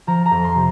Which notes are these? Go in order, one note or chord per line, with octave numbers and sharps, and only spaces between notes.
F3 A#5
A#5
F2
C6
C3